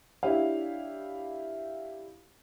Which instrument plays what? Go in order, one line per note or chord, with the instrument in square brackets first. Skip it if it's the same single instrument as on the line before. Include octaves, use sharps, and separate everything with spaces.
[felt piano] D4 E4 G4 C#5 F5